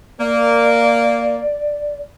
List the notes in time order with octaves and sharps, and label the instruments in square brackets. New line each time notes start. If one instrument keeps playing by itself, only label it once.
[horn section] A#3 [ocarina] D5